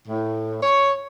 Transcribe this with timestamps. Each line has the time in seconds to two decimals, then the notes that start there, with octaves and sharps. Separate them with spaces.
0.07 A2
0.62 C#5